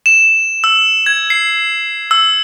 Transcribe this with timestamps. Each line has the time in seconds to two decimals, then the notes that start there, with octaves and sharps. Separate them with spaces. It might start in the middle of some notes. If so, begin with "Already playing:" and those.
0.06 E7
0.64 E6
1.06 G#6
1.30 C7
2.11 E6